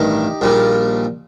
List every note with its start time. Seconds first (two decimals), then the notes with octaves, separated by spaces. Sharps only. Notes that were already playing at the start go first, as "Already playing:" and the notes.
Already playing: A1 G2 D#3 D#4 G4
0.41 A#1 A#2 G3